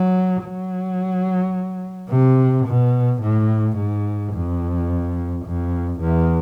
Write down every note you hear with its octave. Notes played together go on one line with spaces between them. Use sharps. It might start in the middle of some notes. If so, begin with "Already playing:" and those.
Already playing: F#3
F#3
C3
B2
A2
G#2
F2
F2
E2